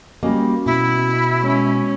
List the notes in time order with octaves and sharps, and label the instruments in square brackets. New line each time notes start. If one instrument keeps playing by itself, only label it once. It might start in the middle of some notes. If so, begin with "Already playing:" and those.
[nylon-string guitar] G3 A#3 [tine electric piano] C#4 F#4 D#5
[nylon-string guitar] B2 [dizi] E4
[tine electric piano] G#3 [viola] C#4